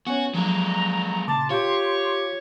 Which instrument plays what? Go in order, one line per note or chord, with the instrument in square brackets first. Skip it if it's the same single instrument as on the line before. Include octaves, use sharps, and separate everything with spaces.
[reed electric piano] B3 C#4 C#5 [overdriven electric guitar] F#4 [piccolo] G#5
[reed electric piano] F3 F#3 D4 [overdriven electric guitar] G#3 A#3 [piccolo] A#5
[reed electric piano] A#2 C#3 D6 [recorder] A5 [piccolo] C6
[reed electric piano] F4 F5 [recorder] G4 [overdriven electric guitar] C#5